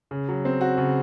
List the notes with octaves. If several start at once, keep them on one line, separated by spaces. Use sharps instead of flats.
C#3
F#3
C4
F#4
C#3